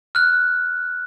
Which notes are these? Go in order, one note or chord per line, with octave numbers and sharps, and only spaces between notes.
F6 F#6